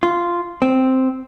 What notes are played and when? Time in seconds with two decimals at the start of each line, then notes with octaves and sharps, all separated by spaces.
0.03 F4
0.62 C4